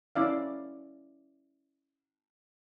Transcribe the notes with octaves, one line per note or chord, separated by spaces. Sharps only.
C#4 E4 D5 F5